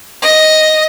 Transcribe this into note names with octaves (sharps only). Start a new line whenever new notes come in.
D#5